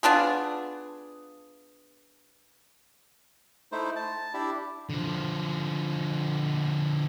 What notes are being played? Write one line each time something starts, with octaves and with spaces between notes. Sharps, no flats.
B3 D4 F4 G#4
A3 D#4 E4 C5
A5
D4 E4 G4
D3 F3